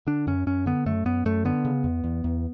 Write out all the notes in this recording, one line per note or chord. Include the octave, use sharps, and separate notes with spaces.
D3 D4
F#2 C#4
F#2 C#4
D3 B3
F#2 A3
F#2 B3
F#2 A3
D3 B3
C#3
E2
E2
E2